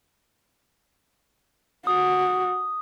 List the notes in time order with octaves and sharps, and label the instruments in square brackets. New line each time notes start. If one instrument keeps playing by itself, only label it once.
[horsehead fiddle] F#4 [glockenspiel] D#6